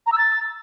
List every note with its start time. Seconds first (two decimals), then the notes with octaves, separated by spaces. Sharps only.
0.06 A#5
0.12 E6
0.18 A6